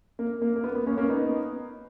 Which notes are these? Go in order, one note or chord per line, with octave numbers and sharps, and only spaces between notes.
A#3
A#3
A#3
B3
B3
A#3 C#4
A#3 C#4
B3 D#4